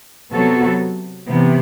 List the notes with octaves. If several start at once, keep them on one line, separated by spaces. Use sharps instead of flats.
C3 F#3 B3 F#4 A4
C3 E3 B3